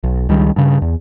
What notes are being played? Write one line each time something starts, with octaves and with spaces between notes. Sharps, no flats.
B1
C#2 D#3 G3
G2 C#3
E2